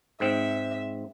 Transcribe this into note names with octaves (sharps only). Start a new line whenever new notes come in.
G#2 C4 E5